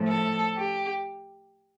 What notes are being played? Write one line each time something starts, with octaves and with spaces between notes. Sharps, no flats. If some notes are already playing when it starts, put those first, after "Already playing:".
Already playing: A2 F3 A3
A4
G4